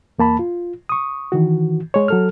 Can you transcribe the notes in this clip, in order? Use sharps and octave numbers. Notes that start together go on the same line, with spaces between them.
E2 A#3 A5 B5
F4
C#6 D#6
D#3 E3 F#4
G#3 C#5
F#3 A4 F6